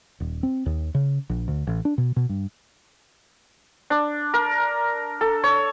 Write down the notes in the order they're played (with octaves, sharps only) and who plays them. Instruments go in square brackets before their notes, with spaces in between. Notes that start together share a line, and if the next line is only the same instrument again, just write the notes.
[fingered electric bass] D#1
C4
D#2
C#3
A#1
D2
A1
D4
B2
B2
G2
[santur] D4
A#4
A4
C#5